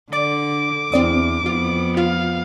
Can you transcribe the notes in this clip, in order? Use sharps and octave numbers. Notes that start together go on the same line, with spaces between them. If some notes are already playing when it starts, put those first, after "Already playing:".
D3 D5 D6
E2 C4 D5 D#6
F2 B3 F4
F4 F5